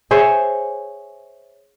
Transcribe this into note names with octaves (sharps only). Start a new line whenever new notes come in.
G#4 C5 C#5 E5